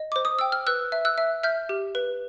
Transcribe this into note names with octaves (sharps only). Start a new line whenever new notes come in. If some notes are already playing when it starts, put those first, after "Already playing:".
Already playing: D#5
C5 D6
D#6
G5 E6
F6
B4 E6 F#6
E5
E6 F#6
E5
E5 F6 G6
G4
B4